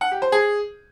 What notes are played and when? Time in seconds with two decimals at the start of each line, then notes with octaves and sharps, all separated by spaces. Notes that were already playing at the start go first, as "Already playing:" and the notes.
0.01 F#5
0.11 G4
0.22 C5
0.32 G#4